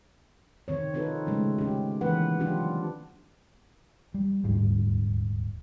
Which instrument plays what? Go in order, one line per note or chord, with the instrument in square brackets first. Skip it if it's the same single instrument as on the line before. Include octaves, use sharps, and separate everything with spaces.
[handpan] D#3 C4 C#5
C4 D#4 F4 A4 B4
C#3 G#3 A3 C#4
C#4 G4
D#3 E3 A#3 B4 F#5
F#3 C4 D4 F4 G4
[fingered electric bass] G3
D#1 D2 G#2 G3